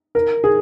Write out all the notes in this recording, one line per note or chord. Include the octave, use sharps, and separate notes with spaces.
A#4
G#4